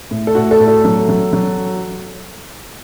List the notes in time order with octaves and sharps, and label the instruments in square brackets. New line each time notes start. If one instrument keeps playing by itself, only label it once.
[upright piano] A2
A4
A2 F#4
A4
A2
A4
F#3
F#3
F#3